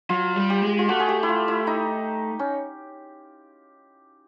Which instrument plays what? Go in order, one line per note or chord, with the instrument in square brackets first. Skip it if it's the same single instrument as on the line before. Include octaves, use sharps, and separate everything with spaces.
[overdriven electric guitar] F#3 [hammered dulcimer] F4
[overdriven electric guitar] G3
[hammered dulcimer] G4
[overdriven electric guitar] G#3
[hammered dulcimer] F4
[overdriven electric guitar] A3 [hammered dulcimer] F#4
[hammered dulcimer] G#4
G4
E4
F4
E4
D#4
C#4